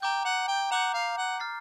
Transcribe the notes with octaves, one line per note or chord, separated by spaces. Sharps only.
G5 A#5 D6 G6
F#5
G5
F#5 A#5 D6 G6
F5
F#5
F6 A6 C7